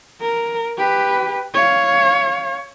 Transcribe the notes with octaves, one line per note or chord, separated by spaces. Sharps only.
A#4
G4 B4
C#5 F5